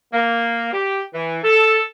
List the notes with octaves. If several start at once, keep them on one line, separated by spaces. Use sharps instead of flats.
A#3
G4
E3
A4